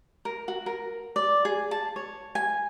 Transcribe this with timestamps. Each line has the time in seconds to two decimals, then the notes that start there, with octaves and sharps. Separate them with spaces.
0.25 A#4
0.48 F#4
0.66 A#4
1.16 D5
1.45 G#4
1.71 A5
1.96 C#5
2.35 G#5